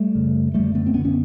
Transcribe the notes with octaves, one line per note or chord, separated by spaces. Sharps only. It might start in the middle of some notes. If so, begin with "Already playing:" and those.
Already playing: G3 A3
F#2 C#3
F#2 D3 G3 A3
A3 B3
C4
F#2 D3 B3 C#4
B3 C#4